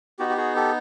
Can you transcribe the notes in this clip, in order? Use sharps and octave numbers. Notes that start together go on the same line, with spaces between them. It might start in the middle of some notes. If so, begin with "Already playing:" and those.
B3 D#4 F#4 G4
G4
F#4 G#4
G4 A4